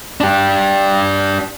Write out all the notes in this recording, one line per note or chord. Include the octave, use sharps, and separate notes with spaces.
D4 G4